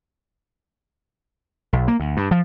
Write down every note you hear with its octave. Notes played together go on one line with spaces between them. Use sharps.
B1
A#3
D2
G2
F3